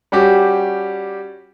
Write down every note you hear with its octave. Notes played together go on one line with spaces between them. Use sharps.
G3 C#4 F#4 G4